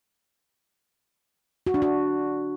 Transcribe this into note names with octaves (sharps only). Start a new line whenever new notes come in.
F#4
D4
F#4